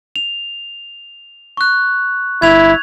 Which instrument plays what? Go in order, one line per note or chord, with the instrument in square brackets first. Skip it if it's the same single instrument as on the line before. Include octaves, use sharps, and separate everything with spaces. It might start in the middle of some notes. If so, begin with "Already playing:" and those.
[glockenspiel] F7
C#6 F#6
[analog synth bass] G1 [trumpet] E4 [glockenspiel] G#6 F7